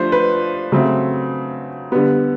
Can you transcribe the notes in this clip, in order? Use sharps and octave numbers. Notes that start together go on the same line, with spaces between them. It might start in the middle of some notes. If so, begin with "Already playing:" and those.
Already playing: F3 A3 D4 C5
B4
C#3 F#3 A3 C4
D3 G3 B3